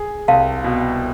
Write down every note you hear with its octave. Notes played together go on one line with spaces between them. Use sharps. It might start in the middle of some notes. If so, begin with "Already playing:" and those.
Already playing: G#4
C2 F5 A5
B2